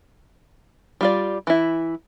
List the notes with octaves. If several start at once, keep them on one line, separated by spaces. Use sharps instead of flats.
G3 F4 D5
E3 E4